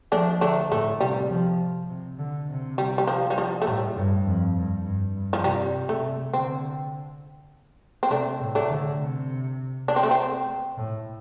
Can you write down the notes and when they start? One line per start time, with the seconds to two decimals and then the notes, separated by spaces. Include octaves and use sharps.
0.12 F3 A3 D4
0.41 D3 A3 D4
0.72 A2 A3
1.01 C3 G3
1.30 F3
1.90 C3
2.19 D3
2.49 C3
2.78 G3
2.98 G3
3.07 F3
3.30 G3
3.38 F3
3.62 A3
3.67 A2 G3
3.96 G2
4.26 F2
4.56 G2
4.85 G2
5.15 G2
5.33 F3
5.44 C3 G3
5.89 C3 A3
6.33 D3 C4
8.03 C4
8.10 C3 A3 D4
8.41 A2
8.55 A3 D4
8.70 D3
9.00 C3
9.88 D4
9.96 C4
10.03 A3
10.11 C4
10.78 A2